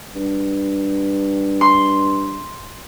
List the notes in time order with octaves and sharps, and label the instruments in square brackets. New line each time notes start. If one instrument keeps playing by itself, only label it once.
[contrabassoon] G2
[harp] C6